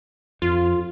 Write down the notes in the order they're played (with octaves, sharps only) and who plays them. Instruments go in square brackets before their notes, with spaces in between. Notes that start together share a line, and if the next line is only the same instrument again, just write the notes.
[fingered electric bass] F2 [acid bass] F4